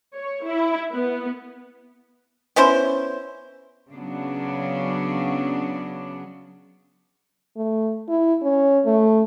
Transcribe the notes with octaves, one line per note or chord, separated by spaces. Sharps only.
C#5
E4
B3
B3 C#4 E4 C5
C#3 F#3 B3 D4
A3
E4
C#4
A3